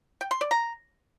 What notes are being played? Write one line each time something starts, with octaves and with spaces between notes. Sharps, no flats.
G5
C6
D5
A#5